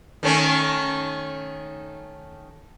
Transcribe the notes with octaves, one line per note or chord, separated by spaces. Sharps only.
D#3 A3 C#4